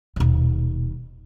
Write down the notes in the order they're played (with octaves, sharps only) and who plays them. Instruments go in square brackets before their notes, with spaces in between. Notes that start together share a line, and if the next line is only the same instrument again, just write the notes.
[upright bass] D#1 B2